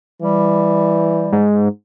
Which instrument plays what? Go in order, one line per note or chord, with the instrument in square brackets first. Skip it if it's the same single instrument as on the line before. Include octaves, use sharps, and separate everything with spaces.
[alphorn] E3 [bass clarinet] G3
[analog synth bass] G#2